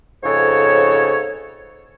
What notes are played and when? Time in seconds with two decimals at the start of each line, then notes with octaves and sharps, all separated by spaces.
0.24 F2 G#2 C#3 A4 C#5